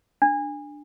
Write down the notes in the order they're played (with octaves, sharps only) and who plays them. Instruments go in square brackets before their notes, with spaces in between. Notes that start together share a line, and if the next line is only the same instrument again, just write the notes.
[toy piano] D4